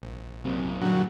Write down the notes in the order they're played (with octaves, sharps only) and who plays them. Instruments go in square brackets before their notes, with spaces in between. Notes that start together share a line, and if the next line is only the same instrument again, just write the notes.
[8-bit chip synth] A#1
[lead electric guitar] F#2 A#3 [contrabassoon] C3
[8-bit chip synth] A#2 G3 [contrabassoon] D3 [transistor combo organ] F#3